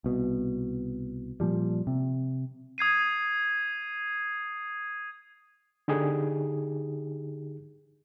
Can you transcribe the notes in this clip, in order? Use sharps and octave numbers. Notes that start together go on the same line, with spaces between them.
C2 B2
A#2 F3 G3
C3
D#6 G#6 C7 D#7
D3 D#4 G4 G#4